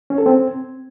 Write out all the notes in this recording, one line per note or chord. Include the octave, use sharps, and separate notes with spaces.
C#4
A4
C4